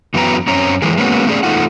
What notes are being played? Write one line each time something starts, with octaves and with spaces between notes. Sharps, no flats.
F#2 E3 F#3 B3 G5 A#5
F#2 C4 C#4 C#5 A#5
E2 G#2 E3 F3 G#3 G#4
G#3 A#3 B3 C#4 F#4
A3 C#4 G#4 D5
E2 A3 D#4 F4 F#5